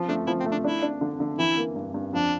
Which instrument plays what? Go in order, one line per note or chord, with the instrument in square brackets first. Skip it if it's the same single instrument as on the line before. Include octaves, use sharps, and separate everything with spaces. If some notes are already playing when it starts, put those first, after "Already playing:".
Already playing: [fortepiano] F3
[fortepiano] A3 [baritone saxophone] D4
[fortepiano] F3 [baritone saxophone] E4
[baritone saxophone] C4
[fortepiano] A3
[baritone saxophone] D4
[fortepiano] D4 [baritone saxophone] E4
[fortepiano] D4
D3
D3
[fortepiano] E3 [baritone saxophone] E4
[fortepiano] A#3
G2
G2
[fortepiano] F2 [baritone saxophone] D4